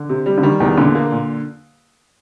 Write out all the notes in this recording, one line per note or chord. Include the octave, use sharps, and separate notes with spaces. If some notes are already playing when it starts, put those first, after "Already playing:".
Already playing: D3
C3
G3
D3
D#3 G3
E2 D#3
A#2 D3
A#3
A#2